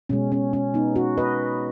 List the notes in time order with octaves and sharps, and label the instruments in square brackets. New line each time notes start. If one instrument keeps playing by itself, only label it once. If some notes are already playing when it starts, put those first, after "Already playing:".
[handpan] B2 G#3 C#4
C#4
C#4
B3 D#4
C#4 F#4
B4 D#5